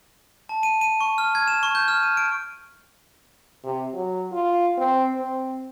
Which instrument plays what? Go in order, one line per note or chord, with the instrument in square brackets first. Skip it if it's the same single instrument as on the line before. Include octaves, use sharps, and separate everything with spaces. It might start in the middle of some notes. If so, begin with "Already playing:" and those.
[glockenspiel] A5
D#7
D#7
C#6
F6
G#6
E7
C#6
G6
F6
D#7
D7
[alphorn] C3
F#3
F4
C4
C4